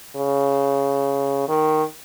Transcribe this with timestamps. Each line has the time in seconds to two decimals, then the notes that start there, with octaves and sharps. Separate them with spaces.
0.15 C#3
1.48 D#3